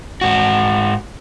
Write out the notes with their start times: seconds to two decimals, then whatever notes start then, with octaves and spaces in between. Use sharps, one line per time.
0.21 G#2 F#4